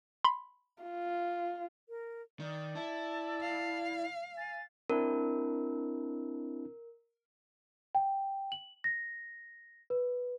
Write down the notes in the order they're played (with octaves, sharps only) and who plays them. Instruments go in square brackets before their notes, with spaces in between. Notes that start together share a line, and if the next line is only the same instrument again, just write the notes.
[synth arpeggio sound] B5 C6
[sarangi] F4
[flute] A#4
[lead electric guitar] D#3 [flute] D5
[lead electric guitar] E4 [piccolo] A5
[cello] F5
[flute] G#5 [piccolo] A6
[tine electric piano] C4 D4 E4 [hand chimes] A#4
[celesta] G5
F#7
A#6
B4